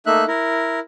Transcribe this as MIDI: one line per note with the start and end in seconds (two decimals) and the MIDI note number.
0.06 0.25 57
0.06 0.25 58
0.06 0.25 63
0.06 0.25 76
0.06 0.25 90
0.28 0.79 64
0.28 0.79 70